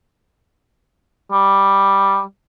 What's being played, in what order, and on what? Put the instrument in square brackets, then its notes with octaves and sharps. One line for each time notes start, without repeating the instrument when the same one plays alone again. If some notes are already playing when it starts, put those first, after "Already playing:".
[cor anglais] G3